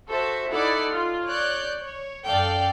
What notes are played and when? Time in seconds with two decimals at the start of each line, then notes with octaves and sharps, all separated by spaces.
0.10 F#4 A4 C5 E5
0.50 D#4 E4 A4 D5 F#5
0.91 F4
1.26 C#5 D5 F#6 G6
1.82 C#5
2.26 F#2 A4 D5 F5 G5